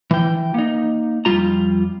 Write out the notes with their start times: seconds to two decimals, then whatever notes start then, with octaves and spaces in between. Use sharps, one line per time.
0.11 E3 G5
0.54 A#3 D#4
1.25 F2 G3 F4 A#5